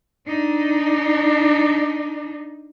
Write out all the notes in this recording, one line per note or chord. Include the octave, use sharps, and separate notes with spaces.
D4 D#4